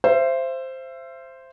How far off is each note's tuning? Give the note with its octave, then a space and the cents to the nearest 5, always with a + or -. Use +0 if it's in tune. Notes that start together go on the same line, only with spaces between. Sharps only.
C5 +0 E5 +35